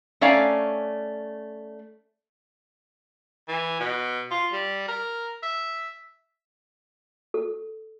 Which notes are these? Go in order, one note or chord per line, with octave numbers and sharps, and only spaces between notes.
A3 C#4 D5 F5 G#5 A#5
E3
B2
F4
G3
A#4
E5
A4